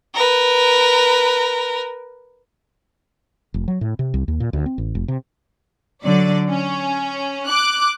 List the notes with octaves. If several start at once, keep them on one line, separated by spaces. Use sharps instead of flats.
A#4 B4
F1
F#3
A2
C3
C2
D#2
A#2
D2
C4
A1
F1
C3
D3 F#3 D5
C#4
D6 F#6